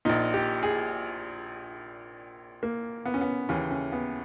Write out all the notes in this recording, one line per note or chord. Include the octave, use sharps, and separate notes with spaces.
A#1 A#2 D#4
G4
G#4
A#3
B3
C#4
B3
D#2 C#3 E3 C#4
C#4
B3